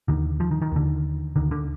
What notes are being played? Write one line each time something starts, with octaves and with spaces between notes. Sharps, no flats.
D#2 D3 D#3
F3
D#3
D#3
D#2 D3
D2 D3 D#3
D3